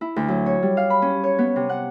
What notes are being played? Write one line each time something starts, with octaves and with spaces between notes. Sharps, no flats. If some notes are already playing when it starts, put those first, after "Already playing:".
E4
D2
F#3
C#5
G3
F5
B5
C#4
C#5
B3
C3
F#5